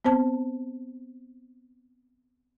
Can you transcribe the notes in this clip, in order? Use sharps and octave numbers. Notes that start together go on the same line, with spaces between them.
B3 C4 C5 A5